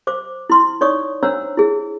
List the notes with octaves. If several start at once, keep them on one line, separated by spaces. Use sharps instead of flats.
C5 D6
E4 C6
D#4 C#5 D5 C#6 D#6
D4 C5 C#5 F#5 A#5 E6
E4 G#4